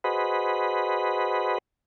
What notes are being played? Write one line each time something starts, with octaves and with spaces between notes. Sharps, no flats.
F#4 G#4 B4 C5 D#5 B5